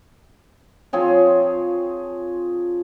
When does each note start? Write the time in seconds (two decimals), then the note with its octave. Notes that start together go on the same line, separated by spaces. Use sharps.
0.93 F3 C4 G#4 C#5